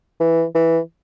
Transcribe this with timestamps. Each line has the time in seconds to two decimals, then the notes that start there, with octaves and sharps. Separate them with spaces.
0.21 E3
0.55 E3